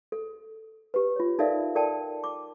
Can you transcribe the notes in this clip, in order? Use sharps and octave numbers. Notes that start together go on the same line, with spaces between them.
A4
G4 B4
F4 C#5
D#4 A4 A#4 D5 E5 F5
A4 A#4 D5 G5 A5
D6